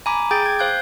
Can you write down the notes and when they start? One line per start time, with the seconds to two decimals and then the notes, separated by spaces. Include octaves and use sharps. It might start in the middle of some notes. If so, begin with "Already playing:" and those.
0.06 G#5 A#5 B5 D6
0.31 G#4 G5 D6 G6 A6
0.46 G#6
0.59 C5 F5 F#6 G6